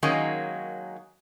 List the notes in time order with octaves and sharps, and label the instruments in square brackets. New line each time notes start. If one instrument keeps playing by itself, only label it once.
[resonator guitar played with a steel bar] D#3 F#3 G#3 A#3 C#4 D#4